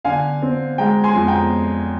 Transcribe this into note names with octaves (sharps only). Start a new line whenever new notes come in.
D3 F5 G#5
C4
G#3 G5 A#5
G#5 C6
F2
G5 A#5